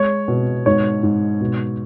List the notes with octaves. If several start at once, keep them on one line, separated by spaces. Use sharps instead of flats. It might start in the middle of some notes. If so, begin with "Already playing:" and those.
Already playing: G#3 C#5
B2
G#2 C#5
G#2
B2